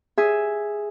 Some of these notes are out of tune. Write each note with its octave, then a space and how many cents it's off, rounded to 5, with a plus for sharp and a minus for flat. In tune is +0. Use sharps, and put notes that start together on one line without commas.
G#4 +0 E5 +0